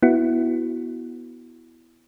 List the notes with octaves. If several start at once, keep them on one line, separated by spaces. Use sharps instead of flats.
B3 E4 F#4